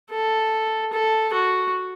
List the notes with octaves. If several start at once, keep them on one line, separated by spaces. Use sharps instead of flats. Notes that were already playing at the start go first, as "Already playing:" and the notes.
A4
A4
F#4